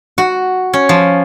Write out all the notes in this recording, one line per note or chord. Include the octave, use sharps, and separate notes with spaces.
F#4
C#4
F3